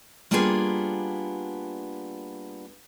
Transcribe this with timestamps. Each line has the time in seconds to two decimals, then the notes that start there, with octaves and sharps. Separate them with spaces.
0.31 G3 A#3 B3 D4 F4 G#4